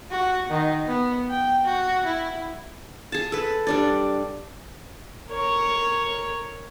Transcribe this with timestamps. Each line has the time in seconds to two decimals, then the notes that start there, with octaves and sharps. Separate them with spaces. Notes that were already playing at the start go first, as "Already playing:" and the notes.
0.11 F#4
0.50 D#3
0.87 B3
1.30 G5
1.65 F#4
2.06 E4
3.12 G#4 A5
3.32 A4 B4
3.67 G3 D4 D5
5.30 A#4 C#5